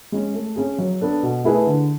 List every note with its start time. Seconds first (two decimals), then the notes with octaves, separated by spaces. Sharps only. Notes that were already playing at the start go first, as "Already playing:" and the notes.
0.12 G#3 C#4
0.34 A3
0.56 C#4 G#4
0.79 F#3
1.01 B3 D4 A4
1.23 B2
1.44 A3 E4 G#4 B4
1.67 D3